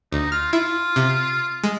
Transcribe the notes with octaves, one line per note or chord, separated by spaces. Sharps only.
D2 D#4
F4 F6
E4 F4
C3
G#3